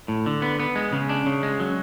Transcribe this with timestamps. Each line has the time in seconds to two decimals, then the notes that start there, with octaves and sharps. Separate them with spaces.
0.08 A2
0.26 D3
0.42 B3
0.60 B3
0.75 G#3
0.92 C#3
1.09 D4
1.26 C#3
1.43 G#3
1.60 F#3